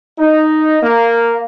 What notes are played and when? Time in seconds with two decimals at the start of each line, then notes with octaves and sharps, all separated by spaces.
0.18 D#4
0.81 A#3